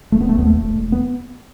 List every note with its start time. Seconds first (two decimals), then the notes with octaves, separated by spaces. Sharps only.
0.12 A3
0.21 E1 B3
0.29 A3
0.38 D#2 B3
0.47 A3
0.57 E1
0.74 E1
0.92 B3